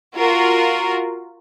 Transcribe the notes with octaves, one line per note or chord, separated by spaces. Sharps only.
F4 F#4 A#4